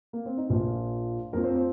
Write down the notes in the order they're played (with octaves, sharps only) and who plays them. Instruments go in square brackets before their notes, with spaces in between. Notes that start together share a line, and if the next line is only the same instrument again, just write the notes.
[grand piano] A#3
C4
D#4
A#1 A#2 F3 F4
F2 F3 A#3 A#4
C4 C5
C4 C5